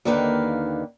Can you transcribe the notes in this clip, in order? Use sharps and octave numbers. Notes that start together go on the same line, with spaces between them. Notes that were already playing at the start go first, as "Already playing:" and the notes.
D#2 D3 D#3 A#3 B4 F5